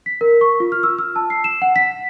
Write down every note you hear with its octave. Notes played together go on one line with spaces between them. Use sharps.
B6
A#4
C#6
F4
F6
E6
E6
A5
C7
E7
F#5
B6